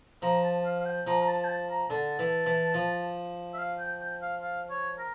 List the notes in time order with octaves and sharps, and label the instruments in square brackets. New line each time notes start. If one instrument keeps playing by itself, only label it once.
[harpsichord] F3 [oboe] A#5
[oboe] A5
F5
F5
G5
[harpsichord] F3 [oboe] A#5
[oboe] A#5
A5
G5
A5
A#5
[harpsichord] D3 [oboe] A5
[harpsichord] E3
E3
F3
[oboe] E5
F5
G5
G5
F5
F5
C#5
A#4